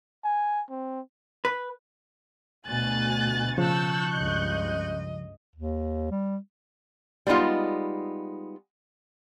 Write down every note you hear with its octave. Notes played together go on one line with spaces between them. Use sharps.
G#5
C4
B4
D2 B2 G#5 F#6 A6
C#3 F3 A5 C#6 E6 F#6 G6
C#2 G2 D#5
D#2
G3
G3 G#3 B3 D#4 F4